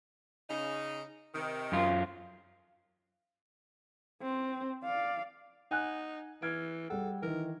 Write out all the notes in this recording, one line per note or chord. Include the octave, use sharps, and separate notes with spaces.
C#3 D#4
C3 D#3
F#2 F4
C4
D5 F5
D#4 F#5 G#5 F#6
E3 F6 G#6 D7
G3 G#4 A4 F#5
D#3 E3 A#4